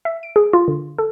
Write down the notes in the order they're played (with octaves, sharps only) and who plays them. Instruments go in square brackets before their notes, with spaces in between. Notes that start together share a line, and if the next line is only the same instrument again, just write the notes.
[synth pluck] E5
D7
G#4
F4
D3
A4